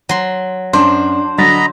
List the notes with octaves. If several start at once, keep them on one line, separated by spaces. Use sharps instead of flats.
F#3 C6
F#2 D4 C5
D3 F#3 D#5 A#5 B5 A6